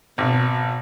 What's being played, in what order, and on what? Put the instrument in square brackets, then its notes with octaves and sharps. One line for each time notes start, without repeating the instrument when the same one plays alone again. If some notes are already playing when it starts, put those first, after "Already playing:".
[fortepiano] G#1 [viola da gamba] B2